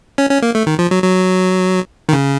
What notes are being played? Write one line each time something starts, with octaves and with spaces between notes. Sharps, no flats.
C#4
C#4
A#3
A3
D#3
F3
F#3
F#3
D#3
C#3